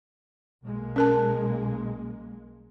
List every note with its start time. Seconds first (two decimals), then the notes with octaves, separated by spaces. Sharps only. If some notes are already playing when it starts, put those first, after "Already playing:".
0.63 B1 G#3 A#3
0.96 C#4 A#4 A5